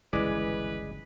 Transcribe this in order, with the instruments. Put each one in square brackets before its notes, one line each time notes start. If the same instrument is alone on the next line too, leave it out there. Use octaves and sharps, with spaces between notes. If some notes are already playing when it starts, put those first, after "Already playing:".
[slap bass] G1 C#2 G#2 [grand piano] E3 [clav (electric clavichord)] G#3 D5 [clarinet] B4